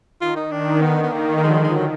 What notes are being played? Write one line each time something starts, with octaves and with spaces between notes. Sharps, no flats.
D#3 F4
D#4
D#3 D4
D3 B3
B3
D#3 A#3
A#3
D3 F3 G#3
F#3
G#3
G#3
F3
F#3